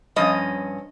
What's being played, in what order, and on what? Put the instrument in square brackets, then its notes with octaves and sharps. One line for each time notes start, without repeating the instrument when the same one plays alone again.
[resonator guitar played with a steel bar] G2 F3 C#4 D#5